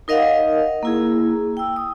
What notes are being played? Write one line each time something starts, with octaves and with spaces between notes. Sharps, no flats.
D#4 A#4 D#5 F5 F#5
A#3 E4 G#4
G5 E6
D#6